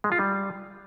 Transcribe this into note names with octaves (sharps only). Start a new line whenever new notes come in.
G#3
F4
G3